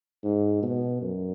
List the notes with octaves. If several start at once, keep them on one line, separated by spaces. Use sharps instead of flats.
G#2
B2
F#2